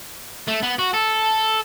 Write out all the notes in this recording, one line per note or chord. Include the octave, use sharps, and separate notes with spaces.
A3
B3
F#4
A4